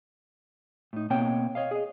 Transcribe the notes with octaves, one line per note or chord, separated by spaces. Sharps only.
A2 D#4
B2 A#3 C4 C#5 G5
C#5 D#5 F5
G#4 D#5